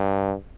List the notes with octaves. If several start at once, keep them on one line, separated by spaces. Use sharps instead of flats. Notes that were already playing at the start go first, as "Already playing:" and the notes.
Already playing: G2